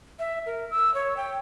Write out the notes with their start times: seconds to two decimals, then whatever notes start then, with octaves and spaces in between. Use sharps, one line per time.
0.19 E5
0.46 A#4
0.71 E6
0.94 C#5
1.17 G5